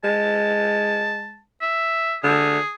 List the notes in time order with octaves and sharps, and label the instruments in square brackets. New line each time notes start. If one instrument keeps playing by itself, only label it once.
[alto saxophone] G#3 [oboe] A5
[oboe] E5
[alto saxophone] D3 [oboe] G#4